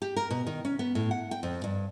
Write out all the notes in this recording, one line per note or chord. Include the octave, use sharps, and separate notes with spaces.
G4
A#4
B2
D#3
C#4
B3
A2
F#5
G5
F2
G2